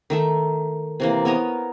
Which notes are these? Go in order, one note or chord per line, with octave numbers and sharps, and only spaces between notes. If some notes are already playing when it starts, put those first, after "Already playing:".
D#3 A3 E5
C3 E3 A#3
B3 A#4 C#5 D#5